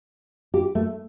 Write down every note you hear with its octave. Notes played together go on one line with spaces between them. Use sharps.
G4
A3